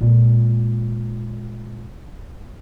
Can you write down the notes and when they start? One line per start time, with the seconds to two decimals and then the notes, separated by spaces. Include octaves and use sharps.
0.01 A#2 G#3